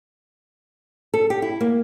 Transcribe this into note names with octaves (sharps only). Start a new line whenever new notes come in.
A4
G4
E4
A#3